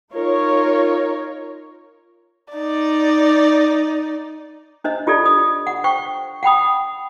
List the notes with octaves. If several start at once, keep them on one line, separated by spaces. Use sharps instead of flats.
D#4 F4 A#4 C#5
D#4 D5
D4 C5 D#5
F4 G4 A4 D5
D#6
F#5
C5 G5 C#6
F#5 G5 B5 D#6